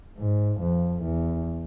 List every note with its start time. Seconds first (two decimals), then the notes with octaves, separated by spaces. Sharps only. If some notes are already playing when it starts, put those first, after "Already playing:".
0.18 G#2
0.61 F2
1.03 E2